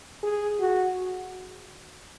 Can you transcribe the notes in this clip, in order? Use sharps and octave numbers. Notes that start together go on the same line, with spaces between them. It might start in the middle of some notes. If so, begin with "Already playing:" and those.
G#4
F#4